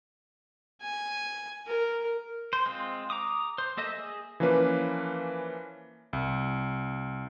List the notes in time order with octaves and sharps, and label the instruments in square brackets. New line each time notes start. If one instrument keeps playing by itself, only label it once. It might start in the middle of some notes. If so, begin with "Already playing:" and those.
[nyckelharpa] G#5
A#4
[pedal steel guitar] C5
G#3 C4 F4
A#5 D6 D#6
C5
A#3 A4 D#5 E5
G#4
[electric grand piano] E3 F3 A#3 C#4 B4
C2